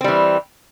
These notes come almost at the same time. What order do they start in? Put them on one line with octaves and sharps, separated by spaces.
C4 G3 E3